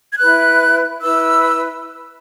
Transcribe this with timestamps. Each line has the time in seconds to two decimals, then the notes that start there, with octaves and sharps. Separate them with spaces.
0.11 G#6
0.19 E4 B4 F#6
1.02 E4 B4 E6